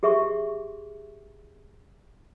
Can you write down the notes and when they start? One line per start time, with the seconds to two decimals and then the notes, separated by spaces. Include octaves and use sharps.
0.03 G4 G#4 E5 C6 C#6